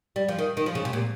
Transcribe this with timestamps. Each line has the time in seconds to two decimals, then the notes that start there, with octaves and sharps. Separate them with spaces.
0.16 G3
0.28 F3
0.39 D#3
0.57 D#3
0.66 F3
0.75 C#3
0.85 C3
0.93 A#2